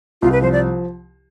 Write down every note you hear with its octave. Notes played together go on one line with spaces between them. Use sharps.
C2 F4
B4
F3 C5
D5